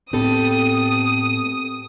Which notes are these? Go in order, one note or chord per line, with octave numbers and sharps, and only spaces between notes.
A2 B3 C4 G4 A4 D#6